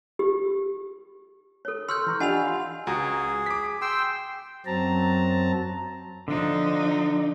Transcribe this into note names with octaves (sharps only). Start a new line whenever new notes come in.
G4
A4 C#5
C6 C#6 E6 F6 G6
E3 A#5 C#6
D4 F4 G4 D#5 F#5 G#5 B5 F7
F5 C6
C#2 F#4 G#4 A#5
D6 B6
G5 C6 E6
F#2 F#3 C4 A5 A#5
D3 F3 D4 D#4